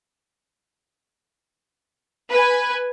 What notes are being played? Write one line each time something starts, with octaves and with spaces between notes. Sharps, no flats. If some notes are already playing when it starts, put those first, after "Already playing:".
B4 G#5